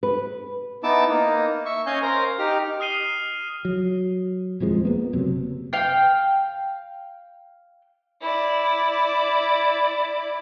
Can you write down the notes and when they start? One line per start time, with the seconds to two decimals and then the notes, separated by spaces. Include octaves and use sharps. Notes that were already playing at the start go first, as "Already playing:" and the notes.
0.03 B4
0.84 B3 D#4 E4 A5 D6 E6
1.09 A#3 D#4
1.65 E5 C#6
1.86 C#4 D#5 F5 G#5 G6
2.02 A#4 C5 F5 A#5
2.39 D#4 G4 F6
2.80 D#6 F6 C7 D#7 G7
3.65 F#3
4.60 D#1 F2 F3 G#3
4.85 A#3 B3
5.13 F#1 C3 F#3
5.73 F5 G5
8.21 E4 D5